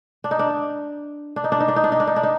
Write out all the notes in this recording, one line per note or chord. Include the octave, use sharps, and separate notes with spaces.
D4
D#4
D4
D4
D#4
D4
D#4
D4
D#4
D4
D#4
D4
D#4
D4
D#4